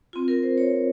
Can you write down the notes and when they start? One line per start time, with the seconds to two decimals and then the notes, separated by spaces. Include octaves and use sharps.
0.13 C4 F4
0.28 A#4
0.43 C5
0.58 C#5